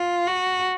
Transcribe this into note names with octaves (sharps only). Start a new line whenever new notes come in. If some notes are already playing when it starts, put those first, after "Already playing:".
Already playing: F4
F#4